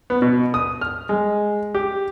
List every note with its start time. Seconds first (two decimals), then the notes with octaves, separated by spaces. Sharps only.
0.10 B3
0.22 B2
0.54 D#6
0.81 F6
1.09 G#3
1.75 G4